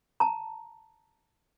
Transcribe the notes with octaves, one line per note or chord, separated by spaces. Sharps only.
A5 A#5